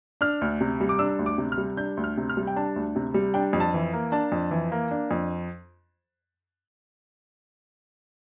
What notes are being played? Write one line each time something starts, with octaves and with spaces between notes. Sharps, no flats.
D4 F6
D2
C3
G3
D6
D4 E6
D2
D6
C3
F6
G3
D4 G6
D2
F6
C3
F6
G3
G5
D4 A5
D2
C3
G3
D4 G5
F2
A5
E3
A#3
D4 A5
F2
E3
A#3
D4
F2